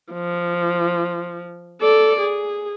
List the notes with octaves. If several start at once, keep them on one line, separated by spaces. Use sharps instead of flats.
F3
A4 D5
G#4